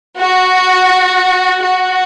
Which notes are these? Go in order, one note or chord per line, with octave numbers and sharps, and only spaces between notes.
F#4
F#4